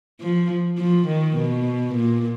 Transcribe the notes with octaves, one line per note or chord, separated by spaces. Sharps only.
F3
F3
D#3
B2
A#2